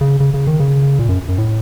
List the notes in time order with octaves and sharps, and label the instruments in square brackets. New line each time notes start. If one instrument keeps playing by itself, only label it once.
[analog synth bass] C#3
C#3
C#3
D#3
C#3
A#2
F#2
F#2
A2